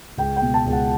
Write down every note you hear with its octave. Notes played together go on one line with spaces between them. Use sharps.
C#2 G5
G5
B2
A5
C#2
F#5